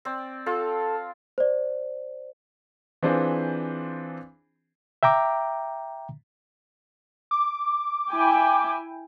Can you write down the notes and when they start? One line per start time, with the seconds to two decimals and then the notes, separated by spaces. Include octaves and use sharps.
0.05 C4 D5
0.46 F4 A4
1.38 C5 D5
3.02 E3 C4 D4 F4 G#4 C5
5.03 E5 G5 A#5 D6
7.31 D6
8.10 E4 G5 G#5